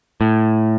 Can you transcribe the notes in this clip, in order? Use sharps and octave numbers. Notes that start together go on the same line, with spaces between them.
A2